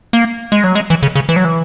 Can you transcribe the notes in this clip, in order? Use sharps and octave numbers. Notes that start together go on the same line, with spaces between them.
A#3
G#3
F#3
G#3
E3
C#3
C#3
E3
F#3
E3